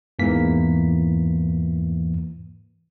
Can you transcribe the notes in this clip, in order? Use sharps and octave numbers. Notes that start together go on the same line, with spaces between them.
E2 G#2 E3 A#3 B6